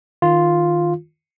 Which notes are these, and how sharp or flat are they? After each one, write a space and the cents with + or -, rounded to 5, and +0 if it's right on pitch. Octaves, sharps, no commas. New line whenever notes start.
D#3 +0 F4 +0